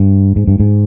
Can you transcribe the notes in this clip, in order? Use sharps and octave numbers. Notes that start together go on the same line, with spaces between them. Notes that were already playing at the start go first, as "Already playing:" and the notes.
Already playing: G2
G#2
G2
G#2